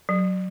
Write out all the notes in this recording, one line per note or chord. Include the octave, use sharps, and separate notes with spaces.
F#3